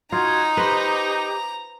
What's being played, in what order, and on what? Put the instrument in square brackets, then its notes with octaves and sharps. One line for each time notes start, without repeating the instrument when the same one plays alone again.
[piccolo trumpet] D#4 [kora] F4 [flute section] F#4 C6 G#6 [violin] A#5
[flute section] G4 D6 [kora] B4 C5